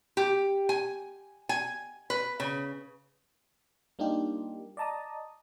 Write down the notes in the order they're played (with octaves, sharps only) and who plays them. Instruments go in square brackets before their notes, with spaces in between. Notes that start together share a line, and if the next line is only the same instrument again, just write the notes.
[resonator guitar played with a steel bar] G4
G#5
G#5
B4
C#3
[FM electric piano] G3 A#3 D4 D#4 F4 G4
D5 D#5 A5 A#5 D#6